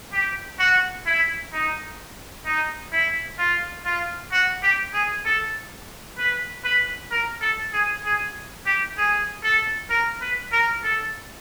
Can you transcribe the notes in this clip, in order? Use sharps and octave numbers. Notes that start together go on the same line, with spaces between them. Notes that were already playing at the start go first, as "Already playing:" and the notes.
G4
F#4
E4
D#4
D#4
E4
F4
F4
F#4
G4
G#4
A4
B4
B4
A#4
A4
G#4
G#4
G4
G#4
A4
A#4
B4
A#4
A4